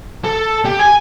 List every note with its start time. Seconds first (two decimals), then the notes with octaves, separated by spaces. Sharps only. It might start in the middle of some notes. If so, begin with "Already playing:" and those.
0.24 A4
0.66 G4
0.80 G#5